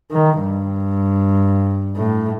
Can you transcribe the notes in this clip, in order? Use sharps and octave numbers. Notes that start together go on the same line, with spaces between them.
D#3
G2
A2